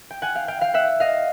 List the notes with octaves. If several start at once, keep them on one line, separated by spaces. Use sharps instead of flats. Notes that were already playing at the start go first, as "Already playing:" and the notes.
G5
F#5 G#5
F5 G5
F5 G5
F5 G5
E5 F#5
D#5 F5